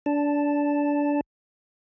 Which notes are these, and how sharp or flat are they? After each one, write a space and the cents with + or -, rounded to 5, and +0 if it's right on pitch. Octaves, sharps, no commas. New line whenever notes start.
D4 -20 A5 +0